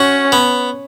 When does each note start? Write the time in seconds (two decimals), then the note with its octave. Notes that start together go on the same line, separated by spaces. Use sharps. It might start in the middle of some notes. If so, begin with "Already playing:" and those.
Already playing: C#4 F#4
0.32 B3